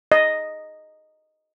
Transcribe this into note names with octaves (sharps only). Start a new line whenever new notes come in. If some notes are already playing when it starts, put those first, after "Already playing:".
D#5